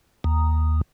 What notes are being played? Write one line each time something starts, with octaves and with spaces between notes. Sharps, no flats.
D#2